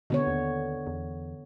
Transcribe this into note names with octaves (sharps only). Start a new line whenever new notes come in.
B2 D3 B3 C#5
D#2
E2